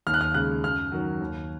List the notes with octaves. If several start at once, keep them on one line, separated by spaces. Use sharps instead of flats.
D#2 F6
F#6
F6
C#3 G#3 F#6
F#2 F6
D#3 F#3
D#2